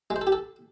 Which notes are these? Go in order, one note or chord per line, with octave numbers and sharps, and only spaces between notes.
G#3
C5
A4
G4
A4